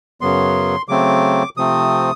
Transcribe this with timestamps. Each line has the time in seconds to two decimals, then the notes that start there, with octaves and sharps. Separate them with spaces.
0.21 F#2 C#3 F#3 B3 C6
0.88 C#3 F#3 A3 C4 D6
1.57 C3 F3 A3 C4 D#6